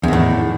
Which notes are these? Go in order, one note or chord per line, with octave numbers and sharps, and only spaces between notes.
E2 A2 D#3